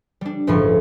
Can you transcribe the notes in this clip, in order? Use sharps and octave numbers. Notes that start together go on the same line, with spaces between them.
G3 D4
G1 C#2 A2 F3 C6 C#6